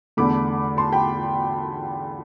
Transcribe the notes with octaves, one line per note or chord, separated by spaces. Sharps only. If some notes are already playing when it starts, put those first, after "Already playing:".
E2 D3 A3 B5 D6
A5 C6
G5 B5